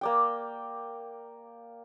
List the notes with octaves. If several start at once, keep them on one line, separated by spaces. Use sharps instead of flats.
A#3 D5 G5